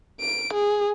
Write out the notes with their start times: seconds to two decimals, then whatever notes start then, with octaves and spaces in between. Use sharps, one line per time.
0.21 D7
0.54 G#4